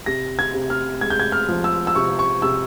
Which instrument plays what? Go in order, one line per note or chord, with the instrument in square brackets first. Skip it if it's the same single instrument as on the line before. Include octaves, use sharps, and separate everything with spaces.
[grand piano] C3 A#6
G#6
C3
F6
G#3 G#6
G6
G#6
F6
F3
E6
E6
C3 C#6
C#6
C3 E6